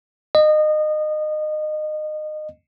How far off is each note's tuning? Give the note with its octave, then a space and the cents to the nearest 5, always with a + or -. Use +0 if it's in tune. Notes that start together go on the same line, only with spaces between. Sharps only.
D#5 -25